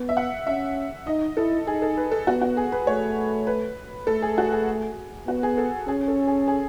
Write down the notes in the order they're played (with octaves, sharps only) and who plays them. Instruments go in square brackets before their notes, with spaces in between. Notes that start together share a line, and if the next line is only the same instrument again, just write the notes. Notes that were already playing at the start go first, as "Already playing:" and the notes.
Already playing: [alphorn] B3
[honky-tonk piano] E5
F#5
[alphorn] C#4 [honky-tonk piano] E5
[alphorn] D#4 [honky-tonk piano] D#5
[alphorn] E4 [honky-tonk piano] A4
[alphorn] D#4 [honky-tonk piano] G#4
[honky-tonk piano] A4
B4
A4
[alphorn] B3 [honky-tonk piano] F#4
[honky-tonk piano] F#4
G#4
B4
[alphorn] A3 [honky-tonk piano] C#5
[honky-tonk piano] B4
[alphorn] A3 [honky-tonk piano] A4
[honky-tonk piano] G#4
F#4
G#4
[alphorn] B3 [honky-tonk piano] F#4
[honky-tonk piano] G#4
A4
[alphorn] C#4 [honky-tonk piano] G#4
[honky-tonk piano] A4
G#4
G#4